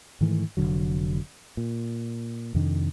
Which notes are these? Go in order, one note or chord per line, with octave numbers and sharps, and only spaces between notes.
G#2 D#3 E3 A3
F1 B1 D3 F#3
A#2
F2 C3 D#3 D4